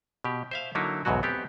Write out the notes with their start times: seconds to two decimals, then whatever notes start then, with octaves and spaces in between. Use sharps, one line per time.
0.24 B2 G4
0.51 C5 E5 F5
0.75 D3 F#3 A#3 D#4 E4
1.05 B1 E2 G#2 B2 F#3 F#4
1.23 B3 C4 G4